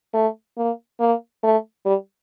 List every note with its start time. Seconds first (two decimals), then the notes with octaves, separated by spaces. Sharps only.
0.14 A3
0.57 A#3
1.00 A#3
1.43 A3
1.86 G3